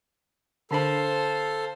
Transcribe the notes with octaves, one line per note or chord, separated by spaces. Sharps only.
D3 D4 A4 C5 F5 B5